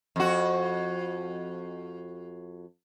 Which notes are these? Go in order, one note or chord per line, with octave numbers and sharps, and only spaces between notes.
F2 F#4